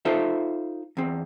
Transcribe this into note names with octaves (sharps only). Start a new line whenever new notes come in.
D#4 F4 A4 C5 E5
E2 C4